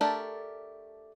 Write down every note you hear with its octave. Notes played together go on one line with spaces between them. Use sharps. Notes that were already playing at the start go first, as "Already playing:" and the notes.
A3 D4 G4 A4 A#4